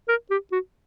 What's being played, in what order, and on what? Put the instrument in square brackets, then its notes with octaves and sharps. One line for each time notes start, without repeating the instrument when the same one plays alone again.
[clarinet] A#4
G4
F#4